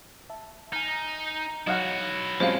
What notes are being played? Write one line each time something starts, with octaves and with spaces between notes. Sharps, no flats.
E5 A5
D#4 G#5 F6
F#3 D#4 E4 F#4 C#5 D#5 F5 F#5
F3 F#3 G#3 C4 C#4 G4 C5 F5